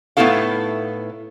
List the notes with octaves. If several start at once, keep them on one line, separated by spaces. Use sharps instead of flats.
A2 B3 D#4 E4 A4 F5